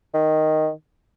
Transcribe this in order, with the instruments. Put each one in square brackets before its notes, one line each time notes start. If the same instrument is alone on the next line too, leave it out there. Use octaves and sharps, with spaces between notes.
[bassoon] D#3